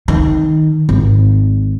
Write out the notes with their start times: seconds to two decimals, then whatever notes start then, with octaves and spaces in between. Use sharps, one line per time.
0.08 D#3
0.89 G#1